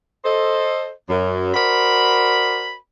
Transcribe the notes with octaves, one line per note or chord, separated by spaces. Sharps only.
A4 C5 D#5
F#2
F#4 A#4 C5 D5 B5